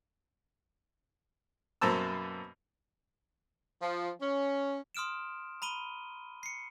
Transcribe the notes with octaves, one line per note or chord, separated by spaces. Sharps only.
F#2 B2 A#3 C5 A5 E6
F3
C#4
C6 D#6 F6 D7 E7
A#5 B5 D#7 G7
C7 C#7